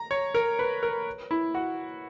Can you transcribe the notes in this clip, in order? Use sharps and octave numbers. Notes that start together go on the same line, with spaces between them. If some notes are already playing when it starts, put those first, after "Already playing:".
Already playing: A#5
C#5
A#4
B4
A#4
E4
F#4